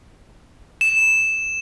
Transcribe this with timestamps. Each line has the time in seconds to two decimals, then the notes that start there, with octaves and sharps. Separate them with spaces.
0.81 E7